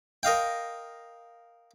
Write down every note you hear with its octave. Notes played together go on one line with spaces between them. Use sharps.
A#4 D#5 F5 G5